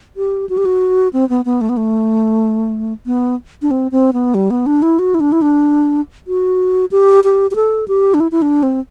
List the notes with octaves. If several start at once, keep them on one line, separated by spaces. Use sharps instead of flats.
G4
F#4
G4
F#4
C4
B3
B3
A3
B3
A3
B3
D4
C4
C4
B3
G3
B3
D4
E4
F#4
E4
D4
E4
D4
F#4
G4
G4
G4
A4
G4
D4
E4
E4
D4
C4